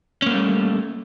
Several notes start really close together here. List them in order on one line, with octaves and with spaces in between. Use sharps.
C#4 A#3 A3 G3